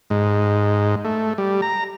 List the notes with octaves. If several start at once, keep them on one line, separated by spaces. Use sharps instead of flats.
G#2
A3
G3
A#5